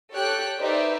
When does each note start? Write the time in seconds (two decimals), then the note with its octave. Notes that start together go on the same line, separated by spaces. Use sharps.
0.13 G4 A4 C#5 G5 F#6
0.60 D#4 G4 B4 C5 D5 E5